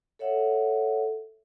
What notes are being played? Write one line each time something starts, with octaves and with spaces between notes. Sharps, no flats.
A4 C#5 E5 F#5